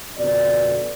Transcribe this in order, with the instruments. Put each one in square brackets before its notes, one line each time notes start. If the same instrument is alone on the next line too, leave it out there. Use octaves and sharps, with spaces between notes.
[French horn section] F2 B2 D3 D5